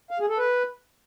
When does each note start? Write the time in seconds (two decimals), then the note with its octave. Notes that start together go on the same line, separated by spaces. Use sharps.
0.11 F5
0.20 G#4
0.29 A4
0.38 B4